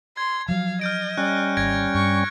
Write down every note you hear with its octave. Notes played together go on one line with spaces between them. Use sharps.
C6 G#6
F3 F#3 F5
D#5 F6 G6 D7
G3 C#4 F#6
G#1 G#6 A#6 D7
G2 C#6